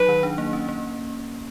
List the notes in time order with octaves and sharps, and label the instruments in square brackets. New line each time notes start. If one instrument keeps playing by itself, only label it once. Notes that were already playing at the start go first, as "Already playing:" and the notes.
Already playing: [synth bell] F#3 D#4 [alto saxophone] B4
[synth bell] D#3
D4
A#3
C#4
A#3